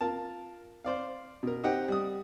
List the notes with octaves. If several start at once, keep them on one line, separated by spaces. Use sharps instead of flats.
F4 A#4 A5
C5 D5 F5
B2 A#4
C4 D#4 G4 D#5 F#5 G5
G3 D#6